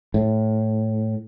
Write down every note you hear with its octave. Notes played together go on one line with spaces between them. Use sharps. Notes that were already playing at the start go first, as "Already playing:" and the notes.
A2